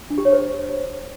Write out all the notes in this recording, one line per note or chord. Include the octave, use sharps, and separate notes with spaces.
D4
G4
C#5
C5